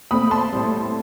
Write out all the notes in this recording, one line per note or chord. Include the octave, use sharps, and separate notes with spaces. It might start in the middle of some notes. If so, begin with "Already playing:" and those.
B2 A3 C4 B5 D#6
A5 C6
A2 G3 C4